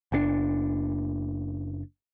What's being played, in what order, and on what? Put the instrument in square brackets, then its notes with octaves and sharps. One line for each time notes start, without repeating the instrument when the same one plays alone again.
[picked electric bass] F#1 A#2 D4